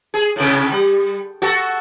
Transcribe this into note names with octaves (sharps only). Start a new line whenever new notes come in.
G#4
A2 C3
G3
F#4 A4